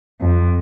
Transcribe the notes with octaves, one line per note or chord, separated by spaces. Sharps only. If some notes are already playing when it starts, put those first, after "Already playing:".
F2